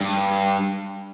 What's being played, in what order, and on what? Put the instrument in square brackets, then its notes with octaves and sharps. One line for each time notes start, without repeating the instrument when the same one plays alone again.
[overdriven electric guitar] G2